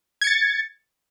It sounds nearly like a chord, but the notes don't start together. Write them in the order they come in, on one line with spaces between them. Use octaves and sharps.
G#6 C#7 A6